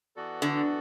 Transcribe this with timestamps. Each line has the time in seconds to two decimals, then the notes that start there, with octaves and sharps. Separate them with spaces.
0.16 E3 B3 F#4 A4 D5
0.42 D3